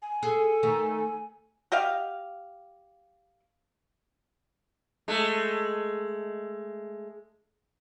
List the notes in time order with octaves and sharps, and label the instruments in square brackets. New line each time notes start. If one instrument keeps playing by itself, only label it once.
[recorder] G#5
[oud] G#4 [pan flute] A4
[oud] D#3 A3
[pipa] F#4 G4 D#5 F5
[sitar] G#3 A3